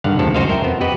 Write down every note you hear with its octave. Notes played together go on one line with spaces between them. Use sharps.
G2 D3 D#3 F5 F#5
D2 D#3 F3 G#3 C4 A4
C#2 F#2 F#4 C5 D#5 F5
A#4 C5 E5 G5
F2 B3 C4
F#4 G4 B4 D#5